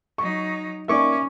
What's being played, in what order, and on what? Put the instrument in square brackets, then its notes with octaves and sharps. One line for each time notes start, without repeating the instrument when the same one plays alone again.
[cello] F#3 D#4 [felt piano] C#6
[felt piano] A#3 D#4 D5 [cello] C#4 [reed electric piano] E5 C#6 D6